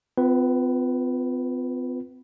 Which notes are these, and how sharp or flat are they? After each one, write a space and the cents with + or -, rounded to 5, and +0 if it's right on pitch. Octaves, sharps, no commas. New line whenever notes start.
C4 -45 F4 +0 B4 +0